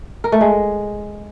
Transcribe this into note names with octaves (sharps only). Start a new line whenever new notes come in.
A#4
A3
G#3